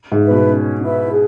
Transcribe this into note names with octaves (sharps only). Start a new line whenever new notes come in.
G#2
E4 B4 E5
B2
C#4
E4 B4 E5
G#4